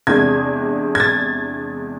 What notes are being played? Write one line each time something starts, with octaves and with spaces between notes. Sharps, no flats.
E2 C3 G#3 D4 G#6
G#6
A6